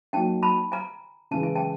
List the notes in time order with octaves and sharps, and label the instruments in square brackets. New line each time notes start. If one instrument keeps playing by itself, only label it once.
[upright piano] F#3 A#3 D#4 [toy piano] G5 A5
[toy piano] A5 B5
G#5 A#5
[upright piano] C#3 E3 G#3 [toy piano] A5
[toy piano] G#5
G5 A5